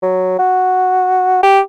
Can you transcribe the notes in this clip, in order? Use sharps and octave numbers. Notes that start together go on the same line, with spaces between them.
F#3
F#4
G4